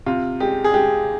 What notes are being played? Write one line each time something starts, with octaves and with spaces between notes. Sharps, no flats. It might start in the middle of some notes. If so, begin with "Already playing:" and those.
C3 F4
G#3 G4
G#4
G#3 G4